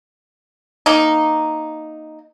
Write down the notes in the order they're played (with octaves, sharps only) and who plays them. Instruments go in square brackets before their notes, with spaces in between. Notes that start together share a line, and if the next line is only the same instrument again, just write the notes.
[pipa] A#3 D#4